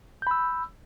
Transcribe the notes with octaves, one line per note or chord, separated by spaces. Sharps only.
B5 E6 G6